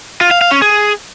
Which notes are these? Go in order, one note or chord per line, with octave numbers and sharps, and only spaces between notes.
F4
F5
F5
C#4
G#4